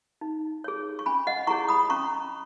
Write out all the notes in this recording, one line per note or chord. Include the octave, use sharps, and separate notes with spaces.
D#4
G#4 C#5
C#6
C#4 G#5 B5
D#5 F#5
E4 G#4 C#5 A#5 C#6
B5 D#6
C#4 A#5 C#6